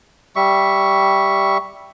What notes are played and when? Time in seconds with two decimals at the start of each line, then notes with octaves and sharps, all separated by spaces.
0.36 G3 E5 C#6